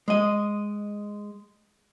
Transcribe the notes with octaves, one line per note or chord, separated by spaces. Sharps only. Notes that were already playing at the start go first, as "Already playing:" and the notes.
G#3 D#5